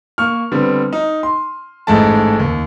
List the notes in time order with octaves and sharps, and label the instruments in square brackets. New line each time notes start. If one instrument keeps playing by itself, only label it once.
[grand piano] A#3 C#6 F6
D3 G3 B3 C4
D#4
C6
A1 G#2 G#3 A3 A5
D#2